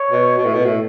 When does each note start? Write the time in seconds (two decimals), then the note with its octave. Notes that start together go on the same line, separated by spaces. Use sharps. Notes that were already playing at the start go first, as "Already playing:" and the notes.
Already playing: C#5
0.10 B2
0.37 B2
0.45 A2
0.54 B2
0.65 A2